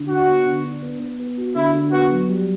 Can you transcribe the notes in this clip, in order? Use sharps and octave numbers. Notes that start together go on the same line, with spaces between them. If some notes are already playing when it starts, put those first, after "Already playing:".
Already playing: D3
D4 F#4
B3
D3
D4
B3
B3
B3
F#4
D3 E4
D3
B3 F#4
F#3
G3